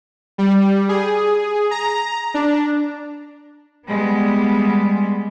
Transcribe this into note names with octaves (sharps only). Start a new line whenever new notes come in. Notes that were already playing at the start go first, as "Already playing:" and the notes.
G3
G#4
A#5
D4
G3 G#3 B3